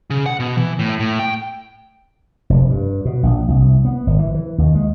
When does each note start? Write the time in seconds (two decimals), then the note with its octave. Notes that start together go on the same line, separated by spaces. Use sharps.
0.10 C#3
0.26 F#5
0.40 B2
0.58 E3
0.79 A2
0.99 A2
1.19 G5
2.50 F1
2.70 G2
3.05 B2
3.23 A#1
3.48 C2
3.85 B3
4.07 G#1
4.19 E3
4.35 E3
4.58 D#2
4.75 G#3